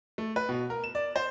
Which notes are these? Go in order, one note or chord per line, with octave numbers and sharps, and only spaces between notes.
A3
B4
B2
A#4
E7
D5
C5